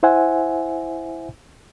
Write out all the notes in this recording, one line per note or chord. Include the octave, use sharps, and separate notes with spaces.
E4 C5 E5 F#5 G#5